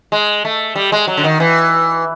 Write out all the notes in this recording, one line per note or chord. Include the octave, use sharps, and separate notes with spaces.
G#3
A3
G3
G#3
F#3
D3
D#3
E3